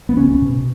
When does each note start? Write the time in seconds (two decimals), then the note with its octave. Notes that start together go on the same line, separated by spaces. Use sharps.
0.09 B3
0.16 C#2 C#4
0.42 B2